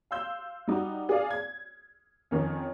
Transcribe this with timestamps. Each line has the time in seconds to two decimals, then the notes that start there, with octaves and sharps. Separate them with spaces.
0.11 F5 C6 E6 G6
0.68 G3 D#4 F#4
1.09 G#4 D5 F5
1.31 G#6
2.31 F2 D#3 C#4